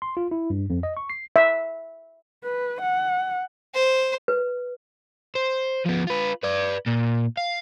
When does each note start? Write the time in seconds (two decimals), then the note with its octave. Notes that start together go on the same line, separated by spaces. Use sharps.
0.02 C6
0.17 F4
0.31 E4
0.50 G2
0.70 F2
0.83 D#5
0.97 C#6
1.10 C7
1.36 E5
2.44 B4
2.82 F#5
3.75 C5
4.28 B4
5.35 C5
5.86 F3 B3
6.07 F4 B4
6.43 B4 D5
6.87 A#2
7.37 F5